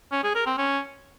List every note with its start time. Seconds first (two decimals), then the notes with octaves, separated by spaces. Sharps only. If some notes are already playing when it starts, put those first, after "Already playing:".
0.12 C#4
0.23 G#4
0.35 A#4
0.46 C4
0.58 C#4